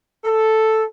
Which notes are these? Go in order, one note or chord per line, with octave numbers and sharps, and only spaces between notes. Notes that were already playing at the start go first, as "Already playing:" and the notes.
A4